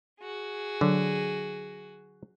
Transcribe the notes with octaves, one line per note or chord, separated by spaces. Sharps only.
F#4 G#4
D3 F#3